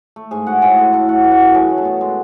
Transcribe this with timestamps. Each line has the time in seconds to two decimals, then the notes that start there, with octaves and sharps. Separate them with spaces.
0.16 A3
0.31 G#2 G#4 G#5
0.47 G#2 F#4 F#5
0.62 A2 G#4 G#5
0.77 G#3 A4 A5
0.93 A2 A4 A5
1.08 A3 F#4 F#5
1.24 E3
1.31 F#4 F#5
1.39 F#2
1.54 F#3 G#4 G#5
1.70 A3
1.77 A4 A5
1.85 B2
2.01 G#3